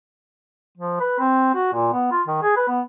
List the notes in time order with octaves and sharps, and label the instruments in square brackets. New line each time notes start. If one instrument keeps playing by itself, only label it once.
[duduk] F3
B4
C4
F#4
A#2
B3
F4
D#3
G#4
B4
B3